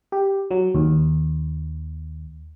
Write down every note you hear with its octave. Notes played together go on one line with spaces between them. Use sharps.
G4
F#3
D#2